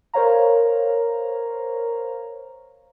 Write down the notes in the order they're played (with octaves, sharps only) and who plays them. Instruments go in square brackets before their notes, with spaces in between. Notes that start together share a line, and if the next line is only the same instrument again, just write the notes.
[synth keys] A#4 C5 C#5 F5 A#5